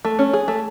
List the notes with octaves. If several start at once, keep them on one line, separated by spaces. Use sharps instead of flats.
A3
C#4
G#4
A3